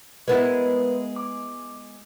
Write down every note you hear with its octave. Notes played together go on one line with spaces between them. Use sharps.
G#3 B3 E4 A#4 B4
D6